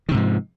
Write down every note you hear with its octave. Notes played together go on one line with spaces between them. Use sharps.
G#2 C3 D#3 F3